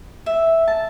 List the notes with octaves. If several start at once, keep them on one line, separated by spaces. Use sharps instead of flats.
E5
A5